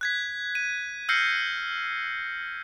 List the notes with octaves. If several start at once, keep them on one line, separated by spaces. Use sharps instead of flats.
F#6 G#6 B6
D#7
E6 F6 G6 A#6 C7 C#7